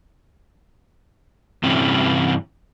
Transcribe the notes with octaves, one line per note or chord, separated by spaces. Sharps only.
G2 C3 E3 C#4